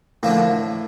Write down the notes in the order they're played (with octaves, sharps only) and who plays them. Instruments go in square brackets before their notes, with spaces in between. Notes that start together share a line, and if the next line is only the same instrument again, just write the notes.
[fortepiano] A2 [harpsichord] D3 F3 A#3